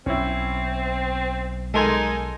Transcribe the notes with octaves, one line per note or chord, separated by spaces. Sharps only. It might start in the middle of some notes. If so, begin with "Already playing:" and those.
B1 C4 C#4 E4
G#3 D#4 A4 A#4 G#5 C6